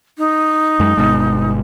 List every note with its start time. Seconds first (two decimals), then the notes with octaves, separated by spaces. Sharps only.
0.18 D#4
0.80 F#2 G#3
0.97 G1 B2 G#3